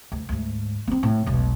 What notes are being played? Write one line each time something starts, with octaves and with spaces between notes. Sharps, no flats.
D2
D2 G#2
B3 C4
A2
E1 B1